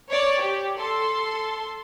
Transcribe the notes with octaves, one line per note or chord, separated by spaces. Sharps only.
C#5 D5
G4
A4 C6